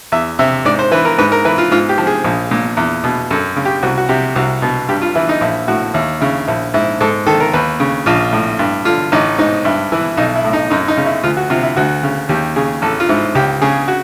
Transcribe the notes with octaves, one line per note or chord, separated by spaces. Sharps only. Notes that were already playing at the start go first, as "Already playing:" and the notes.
E2 E5
C3 E5
G#2 D5
C5
E3 B4
A#4
G#2 B4
A#4
E3 B4
F4
G#2 F4
G4
F3
G#4
A#1
A#2
E2
B2
F#2 A4
C#3
G4
C2 F#4
F#4
C3 G4
C2 F#4
B2
G2 G4
F4
E3 E4
D#4
A#1 E4
A2 F#4
D#2 E4
C#3 E4
A#1 E4
G#2 E4
G#2 A4
D#3 A4
A#4
D#2 B4
C#3
A#1 F4
A2
G2
D3 F4
A1 D#4
G#2 D#4
G2 E4
E3 E4
B1 D#4
E4
A2
D#4
F#2 D#4
D#4
C#3
E4
D2 F4
F#4
C3 F4
E4
D2 F#4
C#3
D#2 G4
C#3 G#4
A1 A4
F4
G#2 E4
C#2 G4
C#3 G#4
F#4